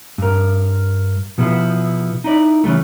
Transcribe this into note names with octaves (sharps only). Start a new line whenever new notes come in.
G2 A#4
B2 F3 B3 E4 G#4
D#4 E4 D5
C#3 E3 G3 A3